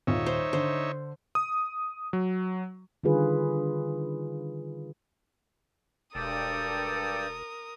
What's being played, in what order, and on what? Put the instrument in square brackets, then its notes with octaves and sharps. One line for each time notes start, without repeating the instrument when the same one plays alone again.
[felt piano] D#1 F4 [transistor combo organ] D#4 C#5 E5
[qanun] C5
[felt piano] D3 [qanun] C5
[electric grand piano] D#6
F#3
[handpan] D3 D#3 G3 F4 G#4 B4
[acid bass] E1 [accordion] G2 D5 G5 [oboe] A4 [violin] A#4 D#6